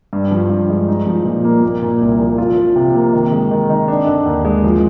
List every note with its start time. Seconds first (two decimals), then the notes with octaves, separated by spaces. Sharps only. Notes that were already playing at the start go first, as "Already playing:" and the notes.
0.13 G2
0.31 F3
0.50 G2
0.70 G#3
0.88 D#4
1.07 F3
1.25 A#2
1.44 A#3
1.63 A#3
1.82 A#2
2.01 C2
2.20 F3
2.38 F4
2.57 F3
2.76 C3
2.95 A#3
3.13 D#3
3.32 G#3
3.51 D#3
3.70 D#4
3.88 D4
4.07 D3
4.26 D#2
4.45 G#3
4.64 F3